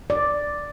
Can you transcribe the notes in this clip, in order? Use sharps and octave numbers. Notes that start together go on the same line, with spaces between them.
D5